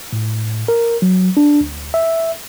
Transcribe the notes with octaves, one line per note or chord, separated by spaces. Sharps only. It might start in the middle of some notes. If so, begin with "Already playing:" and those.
A2
A#4
F#3
D4
D2
E5